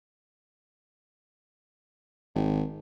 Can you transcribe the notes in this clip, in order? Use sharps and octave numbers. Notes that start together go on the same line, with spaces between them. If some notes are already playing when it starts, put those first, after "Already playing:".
G#1